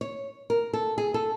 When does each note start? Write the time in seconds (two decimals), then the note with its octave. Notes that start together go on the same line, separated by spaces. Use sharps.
0.01 C#5
0.50 A#4
0.73 A4
0.98 G#4
1.14 A4